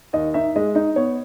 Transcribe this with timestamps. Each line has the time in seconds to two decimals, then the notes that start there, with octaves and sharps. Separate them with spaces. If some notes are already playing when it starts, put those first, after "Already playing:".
0.13 D#2 D#5
0.34 D#4 E5
0.56 G#3 D#5
0.75 D#4 D#5
0.96 B3 C#5